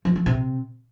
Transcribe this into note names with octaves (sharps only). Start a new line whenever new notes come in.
F3
F3
C3